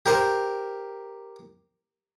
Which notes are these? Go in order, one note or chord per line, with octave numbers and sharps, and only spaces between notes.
G4 A#4 C5